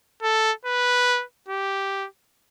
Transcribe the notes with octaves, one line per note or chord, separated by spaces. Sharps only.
A4
B4
G4